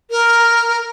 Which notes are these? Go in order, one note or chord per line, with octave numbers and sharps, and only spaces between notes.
A#4